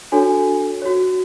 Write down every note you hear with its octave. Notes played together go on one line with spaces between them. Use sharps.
D4 F#4 A4 C#5 G#5
F#4 C#5